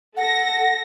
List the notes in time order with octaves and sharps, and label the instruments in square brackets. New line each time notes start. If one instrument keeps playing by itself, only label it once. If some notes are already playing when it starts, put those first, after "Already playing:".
[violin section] A4 A#6 [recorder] F#5